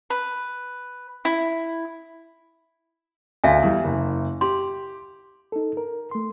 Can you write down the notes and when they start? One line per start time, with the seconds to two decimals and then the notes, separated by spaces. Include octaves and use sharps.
0.10 B4
1.25 E4
3.44 D2 E5 F5 G#5
3.62 E2 G3
3.84 F#1
4.41 G4 C6
5.52 D#4 A4
5.77 A#4
6.11 A3 C6